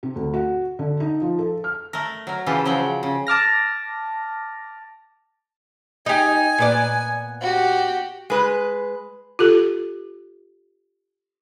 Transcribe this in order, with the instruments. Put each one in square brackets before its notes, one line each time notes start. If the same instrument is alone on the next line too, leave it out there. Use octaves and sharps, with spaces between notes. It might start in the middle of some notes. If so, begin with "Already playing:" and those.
[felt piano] C3
D2
F#4
D3
D#4
F3
A4
F6
[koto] A3 A#4
F#3 A#4
C#3 E3 F4 G4 A4
C#3 F3 F#3 F#5 G5
C#3
[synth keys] A5 D6 F6 A#6
[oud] D#4 G4 [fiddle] G#5
[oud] A#2 B3 D5
[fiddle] F#4 G4
[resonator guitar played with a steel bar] G#3 B4
[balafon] F4 G4 A4